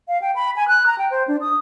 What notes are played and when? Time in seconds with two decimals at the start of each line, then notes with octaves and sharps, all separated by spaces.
0.08 F5
0.22 G5
0.35 B5
0.56 G#5
0.68 F#6
0.86 A#5
0.98 G5
1.11 C5
1.28 D4
1.41 D#6